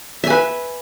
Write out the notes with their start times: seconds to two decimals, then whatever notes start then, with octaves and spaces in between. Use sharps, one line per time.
0.24 E5
0.27 G#5
0.30 B4